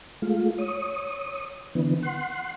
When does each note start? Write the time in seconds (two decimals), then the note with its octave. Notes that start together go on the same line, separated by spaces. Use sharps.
0.22 G#3 A3 F4
0.58 C#5 D#6
1.75 D3 E3 B3
2.03 F#5 C6